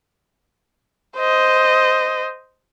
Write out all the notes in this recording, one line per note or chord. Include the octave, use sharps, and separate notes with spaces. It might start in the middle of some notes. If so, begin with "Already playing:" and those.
C5 D#5